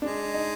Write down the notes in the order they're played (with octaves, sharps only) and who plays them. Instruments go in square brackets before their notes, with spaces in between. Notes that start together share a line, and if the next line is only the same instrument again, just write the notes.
[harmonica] G#3 [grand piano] D4
[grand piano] D#4